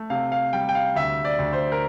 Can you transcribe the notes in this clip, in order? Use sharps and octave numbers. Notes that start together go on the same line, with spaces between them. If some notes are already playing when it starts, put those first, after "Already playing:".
Already playing: A3
C3 F5
F5
G3 G5
G5
F5
D2 E5
D5
D2
C5
A#4